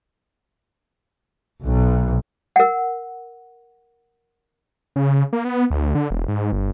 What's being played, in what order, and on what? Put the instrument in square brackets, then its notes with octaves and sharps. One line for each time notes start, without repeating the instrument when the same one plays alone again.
[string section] B1
[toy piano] A#4 F#5
[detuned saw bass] C#3
A#3
B3
D2
D3
E1
G#2
G1